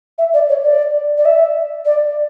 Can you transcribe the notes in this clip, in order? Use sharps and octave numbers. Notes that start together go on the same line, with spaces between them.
E5
D5
C#5
D5
D5
E5
D5